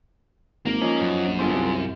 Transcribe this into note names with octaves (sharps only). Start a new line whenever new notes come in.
G#1 A#3
F3 C#4 D#4
F#2
A#1
G1 F4 G#4 C5
C2